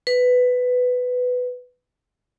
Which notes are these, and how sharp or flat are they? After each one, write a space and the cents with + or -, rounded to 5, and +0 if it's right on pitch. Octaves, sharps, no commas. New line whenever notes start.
B4 +10